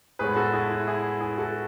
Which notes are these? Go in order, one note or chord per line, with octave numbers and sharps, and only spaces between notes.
A2 G#3 B3 G#4 B4
F#4 A4
E4 G#4
E4
E4 G#4
E4 G#4
F#4 A4